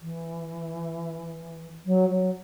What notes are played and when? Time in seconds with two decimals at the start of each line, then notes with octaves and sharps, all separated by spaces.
0.02 E3
1.86 F#3
2.09 F#3